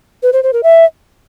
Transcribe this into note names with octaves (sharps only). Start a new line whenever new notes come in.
B4
C5
C5
A#4
E5